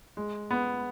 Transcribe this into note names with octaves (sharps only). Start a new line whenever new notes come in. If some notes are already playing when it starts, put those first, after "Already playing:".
G#3
B3